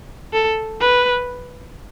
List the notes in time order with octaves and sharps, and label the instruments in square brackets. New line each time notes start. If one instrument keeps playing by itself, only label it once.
[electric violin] A4
B4